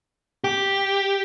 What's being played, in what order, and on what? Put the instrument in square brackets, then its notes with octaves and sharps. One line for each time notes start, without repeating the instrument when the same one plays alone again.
[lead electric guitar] G4